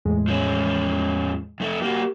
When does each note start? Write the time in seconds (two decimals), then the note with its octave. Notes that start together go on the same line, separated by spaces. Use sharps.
0.05 E2 A2 G#3
0.28 F3 C#4
1.60 F2 A3
1.82 A#3 F#4 G4